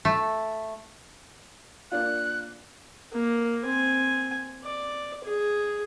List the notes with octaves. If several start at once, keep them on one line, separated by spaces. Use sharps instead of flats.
A3
A#3 D4 F4 F#6
A#3
C4 G#5
D5
G#4